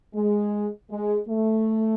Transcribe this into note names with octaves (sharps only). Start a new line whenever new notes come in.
G#3
G#3
A3